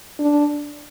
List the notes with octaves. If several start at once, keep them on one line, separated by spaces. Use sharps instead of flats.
D4